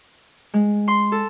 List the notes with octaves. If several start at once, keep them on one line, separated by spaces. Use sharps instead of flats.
G#3
C6
A4